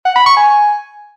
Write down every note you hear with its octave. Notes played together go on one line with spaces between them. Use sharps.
F#5
B5
C#6
G#5